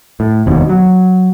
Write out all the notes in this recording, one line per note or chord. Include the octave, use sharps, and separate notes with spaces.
A2
F1 D#2 B2
F#3